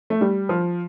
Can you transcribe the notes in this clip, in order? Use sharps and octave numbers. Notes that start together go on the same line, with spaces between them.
A3
G3
F3